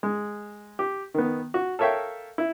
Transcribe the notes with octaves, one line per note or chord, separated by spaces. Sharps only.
G#3
G4
D#3 B3
F#4
A4 A#4 C#5 E5 F5 G5
E4